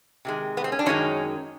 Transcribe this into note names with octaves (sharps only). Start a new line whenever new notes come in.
C3 D#3 G#3
B3
C4
C#4
D4
F#2 D#3 G#3 C#4 D#4